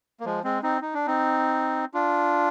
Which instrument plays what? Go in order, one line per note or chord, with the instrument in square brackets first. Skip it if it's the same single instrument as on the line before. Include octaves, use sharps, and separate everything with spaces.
[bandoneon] A#3
F3 G#3
G#3 C4
C4 D#4
D#4
D4
C4 D#4
D4 F4